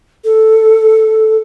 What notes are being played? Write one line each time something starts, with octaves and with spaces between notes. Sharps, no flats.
A4